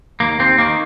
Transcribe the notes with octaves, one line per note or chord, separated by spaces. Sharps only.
D#2 A#3
D#2 C4
D#3 A#3